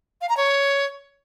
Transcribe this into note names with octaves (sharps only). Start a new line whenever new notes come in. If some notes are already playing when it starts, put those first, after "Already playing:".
F5
A#5
C#5